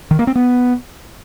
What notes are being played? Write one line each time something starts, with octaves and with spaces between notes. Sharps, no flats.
D#3
A#3
C4
B3